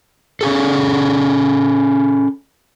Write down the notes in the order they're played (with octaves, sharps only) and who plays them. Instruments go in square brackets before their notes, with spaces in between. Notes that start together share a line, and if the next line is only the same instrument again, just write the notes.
[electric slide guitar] C#4 G#4 A4